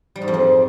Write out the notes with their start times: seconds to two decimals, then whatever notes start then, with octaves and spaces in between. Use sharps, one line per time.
0.16 G3
0.22 G#2
0.28 F2
0.34 F3